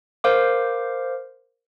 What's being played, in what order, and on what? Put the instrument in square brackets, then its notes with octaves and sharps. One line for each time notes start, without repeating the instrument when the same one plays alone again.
[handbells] A#4 C5 F5 D6